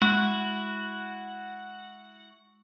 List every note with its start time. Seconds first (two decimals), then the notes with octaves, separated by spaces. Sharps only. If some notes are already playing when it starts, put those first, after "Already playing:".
0.02 G#3 E4 F#4 F#5